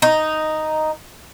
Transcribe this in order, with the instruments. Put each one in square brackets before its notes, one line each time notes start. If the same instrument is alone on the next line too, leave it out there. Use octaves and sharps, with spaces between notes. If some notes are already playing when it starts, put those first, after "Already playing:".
[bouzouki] D#4